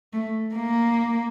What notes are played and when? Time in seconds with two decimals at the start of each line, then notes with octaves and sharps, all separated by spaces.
0.13 A3
0.55 A#3